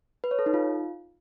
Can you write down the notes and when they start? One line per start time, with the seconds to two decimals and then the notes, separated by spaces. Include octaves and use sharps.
0.24 B4
0.31 C#5
0.39 A4
0.46 D#4
0.54 F4